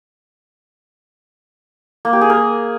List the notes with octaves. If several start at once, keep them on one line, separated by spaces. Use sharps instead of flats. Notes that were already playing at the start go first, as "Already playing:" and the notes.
A#3
G4
G#4
A#4